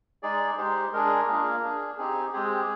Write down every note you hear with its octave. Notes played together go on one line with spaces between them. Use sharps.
G#3 D#4 G#4 D5
G#3 D#4 G4 C5
G#3 D4 G#4 A#4
A#3 D4 F4 G#4
D4 G#4
C4 D#4 G4 G#4
G#3 C4 G4 G#4